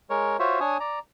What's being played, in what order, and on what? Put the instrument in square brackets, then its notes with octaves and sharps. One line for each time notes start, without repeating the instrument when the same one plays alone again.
[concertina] G#3 A#4 C#5
F4 F#4 C5 C#5 E5
D4 C#5 G#5 D#6
D5 A#5